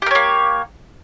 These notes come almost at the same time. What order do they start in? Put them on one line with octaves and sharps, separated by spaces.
G4 A#4 C#5 A#3